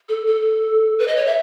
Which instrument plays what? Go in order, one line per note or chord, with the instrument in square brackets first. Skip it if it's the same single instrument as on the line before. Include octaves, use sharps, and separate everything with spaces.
[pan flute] A4
A4
B4
D#5
C#5
E5